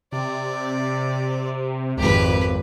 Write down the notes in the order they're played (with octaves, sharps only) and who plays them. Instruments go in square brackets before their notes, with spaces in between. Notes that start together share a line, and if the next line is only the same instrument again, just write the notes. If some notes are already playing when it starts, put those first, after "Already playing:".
[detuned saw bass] C3 [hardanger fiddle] D5
[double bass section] G#1 F2 [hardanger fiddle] G4 B4